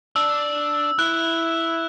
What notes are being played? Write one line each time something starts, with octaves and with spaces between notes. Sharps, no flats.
D4 E6
E4 F#6